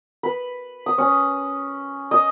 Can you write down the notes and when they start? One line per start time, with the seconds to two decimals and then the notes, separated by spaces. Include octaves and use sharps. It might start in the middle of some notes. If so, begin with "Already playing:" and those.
0.23 B4
0.86 D#6
0.98 C#4
2.11 D#5